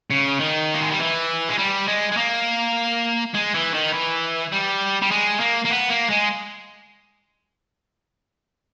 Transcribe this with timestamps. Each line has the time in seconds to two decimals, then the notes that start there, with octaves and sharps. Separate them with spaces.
0.10 C#3
0.39 D#3
0.75 A#3
0.82 G#3
0.91 G3
0.99 E3
1.49 G#3
1.58 G3
1.87 G#3
2.12 G#3
2.17 A#3
3.34 G#3
3.54 E3
3.74 D#3
3.93 E3
4.52 G3
5.02 G3
5.11 G#3
5.41 A#3
5.65 A#3
5.70 B3
5.89 A#3
6.09 G#3